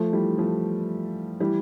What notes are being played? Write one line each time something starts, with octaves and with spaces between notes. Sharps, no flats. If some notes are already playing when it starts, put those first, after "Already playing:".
Already playing: F3 A3
E3 G3
F3 A3
E3 G3